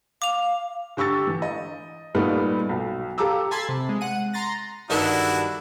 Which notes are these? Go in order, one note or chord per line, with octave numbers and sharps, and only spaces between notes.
F5 D6 F7
D3 G4 C#6 E6 A6
E3
D#5
A#2 G3 A3 B3 D#4
B1
G4 A4 F5 A#5 D6 E6
G#5 A5 B5 C6 E6 G#6
C3
G#3
F#5 D#7
A#5 C6 A6 A#6
G2 D#3 D4 E4 F#4 A4